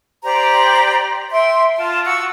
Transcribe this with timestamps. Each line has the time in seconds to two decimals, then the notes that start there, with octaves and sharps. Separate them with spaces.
0.23 G4 C5 D5 A#5
1.31 E5 G5 C6
1.76 F4 A5
2.04 F#4 C#6 E6